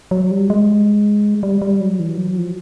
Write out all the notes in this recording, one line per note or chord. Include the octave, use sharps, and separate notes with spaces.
F#3
G3
G#3
G3
G3
F#3
E3
F#3
F3